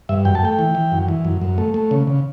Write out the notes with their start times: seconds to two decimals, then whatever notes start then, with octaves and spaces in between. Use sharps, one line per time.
0.09 G2 E5
0.25 F#2 G5
0.35 A5
0.43 A3 G5
0.59 E3
0.75 E3
0.92 F#2
1.08 E3
1.25 F#2
1.41 F#2
1.58 A3
1.74 A3
1.91 C#3
2.07 C#3